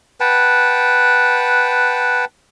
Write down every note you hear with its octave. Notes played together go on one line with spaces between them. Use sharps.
B4 F#5 G5 A5